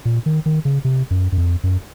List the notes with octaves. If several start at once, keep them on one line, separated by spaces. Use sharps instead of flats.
A#2
D#3
D#3
C#3
C3
F#2
F#2
F2
F#2